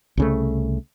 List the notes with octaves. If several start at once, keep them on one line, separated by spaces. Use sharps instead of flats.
C2 C#3 A3